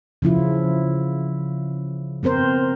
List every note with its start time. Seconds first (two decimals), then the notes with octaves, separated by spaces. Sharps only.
0.22 C#3 F3 E4 F4
2.23 B3 C4 A#4 C5